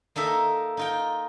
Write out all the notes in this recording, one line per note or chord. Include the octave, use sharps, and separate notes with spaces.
A#3 D#4 A4 E5
D#4 F4 G5